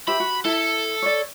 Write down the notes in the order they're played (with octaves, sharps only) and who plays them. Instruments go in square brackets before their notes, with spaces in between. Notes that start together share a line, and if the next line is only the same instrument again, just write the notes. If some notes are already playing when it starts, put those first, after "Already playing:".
[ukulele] G4 C5 E5 [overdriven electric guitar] B5
[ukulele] F#4
[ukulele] E4 [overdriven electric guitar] A4
[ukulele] C#5 D5